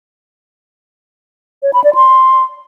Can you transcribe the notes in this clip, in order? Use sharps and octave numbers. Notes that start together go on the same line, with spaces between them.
C#5
B5
D5
C6